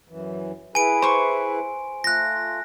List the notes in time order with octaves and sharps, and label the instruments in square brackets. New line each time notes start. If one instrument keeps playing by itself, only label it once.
[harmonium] F#2 E3
[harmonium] E4 G#4 B4 [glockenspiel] G#5 D7
[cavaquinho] C5 C#6
[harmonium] A3 F4 [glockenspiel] F#6 A#6